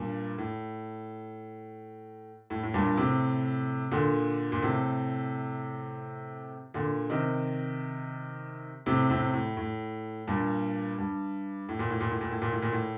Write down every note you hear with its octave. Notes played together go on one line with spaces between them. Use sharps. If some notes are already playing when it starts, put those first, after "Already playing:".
Already playing: G2 A#2
A2
A2
A2
G2 A#2
A2 C3
A#2 D3
A#2
A2 C3
A#2 D3
C3 D#3
A2 C3
A2 C3
A2
A2
G2 A#2
G2
A2
A#2
A2
A#2
A2
A#2
A2
A#2
A2
A#2
A2